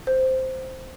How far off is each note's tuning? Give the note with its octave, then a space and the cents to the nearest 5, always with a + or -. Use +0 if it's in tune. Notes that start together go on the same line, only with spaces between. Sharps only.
C5 -5